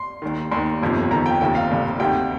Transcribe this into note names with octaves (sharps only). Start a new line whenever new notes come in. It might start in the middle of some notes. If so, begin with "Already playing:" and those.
Already playing: C6
D#2 D#3
D#2 D#3 C6
G1 F2 C3 D#3
G1 F2 C3 D#3 A#5
G5
F1 D#2 D#3 G5
F5
F1 D#2 D#3
D2 C3 D#3 G5